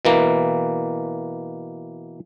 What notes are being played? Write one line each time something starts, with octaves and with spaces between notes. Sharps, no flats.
B2 E3 A#3